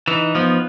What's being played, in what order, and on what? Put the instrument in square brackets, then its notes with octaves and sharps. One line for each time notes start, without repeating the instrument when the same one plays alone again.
[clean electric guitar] E3 [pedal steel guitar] D#4
[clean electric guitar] F3 [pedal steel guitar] B3